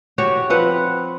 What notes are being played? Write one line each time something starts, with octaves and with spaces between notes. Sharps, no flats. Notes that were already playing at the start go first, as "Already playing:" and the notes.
F#4 G4 C#5
F3 C4 B4 F#5